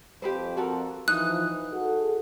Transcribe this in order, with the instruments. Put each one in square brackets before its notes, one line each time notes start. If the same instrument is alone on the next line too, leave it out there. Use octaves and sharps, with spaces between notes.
[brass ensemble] F2 [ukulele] G4 B4 C5
[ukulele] F#4 A4 A#4
[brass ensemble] E3 F3 [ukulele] D#4 [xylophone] F#6
[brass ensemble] F#4 G#4 A4